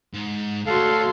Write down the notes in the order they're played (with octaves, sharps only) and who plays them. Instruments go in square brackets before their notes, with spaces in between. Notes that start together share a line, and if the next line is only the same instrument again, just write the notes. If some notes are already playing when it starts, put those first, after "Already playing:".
[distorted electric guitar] G#2
[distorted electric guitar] D2 [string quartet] F#4 C#5 C6 [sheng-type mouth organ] A4 F5